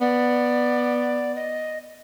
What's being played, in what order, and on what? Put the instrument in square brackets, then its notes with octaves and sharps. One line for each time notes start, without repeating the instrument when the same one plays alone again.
[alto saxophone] B3 [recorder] D5
[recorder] D#5